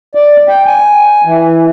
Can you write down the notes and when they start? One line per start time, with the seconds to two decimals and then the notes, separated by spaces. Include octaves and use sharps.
0.15 D5
0.49 G5
0.66 G#5
1.25 E3